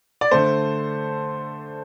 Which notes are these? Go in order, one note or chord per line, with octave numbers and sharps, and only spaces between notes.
D5
D3 A3 C5